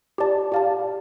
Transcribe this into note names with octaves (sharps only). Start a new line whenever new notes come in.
G4 D5 A5
G4 D5 F5 A5